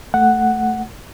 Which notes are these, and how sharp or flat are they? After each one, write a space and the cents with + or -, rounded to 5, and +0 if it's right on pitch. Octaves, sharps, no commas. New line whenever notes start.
A3 +0 F#5 +0